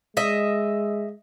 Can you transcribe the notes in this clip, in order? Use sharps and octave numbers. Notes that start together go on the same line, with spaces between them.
G#3 D#5 E5